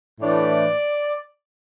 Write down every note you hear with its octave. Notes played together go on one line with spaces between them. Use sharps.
A2 E3 A3 D4 D5